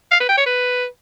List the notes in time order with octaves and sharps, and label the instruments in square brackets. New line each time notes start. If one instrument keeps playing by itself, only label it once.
[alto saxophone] F5
B4
G5
C#5
B4